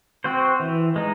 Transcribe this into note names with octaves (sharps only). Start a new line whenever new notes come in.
C4 F#4 C5
E3
G#3 D#4